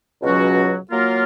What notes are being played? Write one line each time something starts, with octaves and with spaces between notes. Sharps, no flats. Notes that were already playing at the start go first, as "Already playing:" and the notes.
C#2 B2 F#3 C#4 F#4
F#3 A#3 F4 A#4